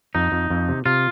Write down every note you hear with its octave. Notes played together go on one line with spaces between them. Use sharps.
F2 D#4
F2
F2
C3
C3 F4